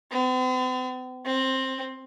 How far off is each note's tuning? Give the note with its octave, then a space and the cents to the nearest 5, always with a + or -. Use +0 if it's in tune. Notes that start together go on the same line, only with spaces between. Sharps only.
C4 -45
C4 +10